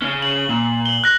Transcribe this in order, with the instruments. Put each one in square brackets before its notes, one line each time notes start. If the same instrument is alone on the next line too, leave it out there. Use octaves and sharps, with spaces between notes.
[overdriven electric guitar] C#3 C#4
[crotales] F#7
[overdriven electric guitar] A#2
[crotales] F#7 G7
F#6 A#6